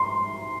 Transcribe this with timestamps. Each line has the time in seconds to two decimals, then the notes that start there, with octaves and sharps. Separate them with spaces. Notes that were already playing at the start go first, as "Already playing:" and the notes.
Already playing: C6